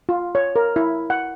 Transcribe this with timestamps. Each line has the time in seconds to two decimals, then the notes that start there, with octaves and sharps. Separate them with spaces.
0.09 F4
0.35 C#5
0.56 A#4
0.76 E4
1.10 F#5